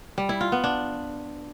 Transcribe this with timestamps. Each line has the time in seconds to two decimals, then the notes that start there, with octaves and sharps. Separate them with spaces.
0.18 G3
0.29 E4
0.41 F4
0.52 B3
0.64 D4